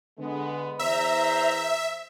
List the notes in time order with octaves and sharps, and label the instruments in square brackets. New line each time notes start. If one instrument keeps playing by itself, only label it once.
[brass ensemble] D3 G#3 B3
[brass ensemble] E2 C5 A#5 [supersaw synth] E5